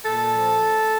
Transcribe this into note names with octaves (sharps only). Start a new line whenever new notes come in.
A#2 A4
F3